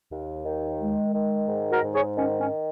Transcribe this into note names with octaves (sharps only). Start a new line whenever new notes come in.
D#2
D#3
G#3
D#3
G#2
F#4 A#4
G#2
G#4 C#5
D#3 C#4
C#4